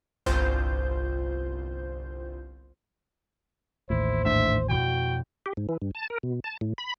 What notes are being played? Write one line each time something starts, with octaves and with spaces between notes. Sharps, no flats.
G1 C2 F4 C5 G6
A1 D#2 A2 E4 C5
G#2 A3 D4 E5
F2 B2 F#4 G5
G4
G#2
E3
G2
A5
A#4
B2
A5
A2
B5